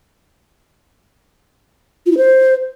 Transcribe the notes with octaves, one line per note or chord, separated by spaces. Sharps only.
F4
E4
C5